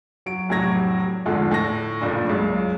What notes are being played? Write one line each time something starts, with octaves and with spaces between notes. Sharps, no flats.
F#3 D7
F1 A2 C3 F#3 G#6 A#6
E2 G#2 D3 F3
A2 A4 A#6
F#1 A#2 D4
C#2 F#2